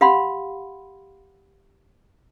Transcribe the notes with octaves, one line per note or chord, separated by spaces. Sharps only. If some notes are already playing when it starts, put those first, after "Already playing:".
G4 F5 F#5 B5 C6